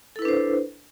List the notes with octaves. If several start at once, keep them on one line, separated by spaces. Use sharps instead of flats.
D4 E4 A4 B4 C5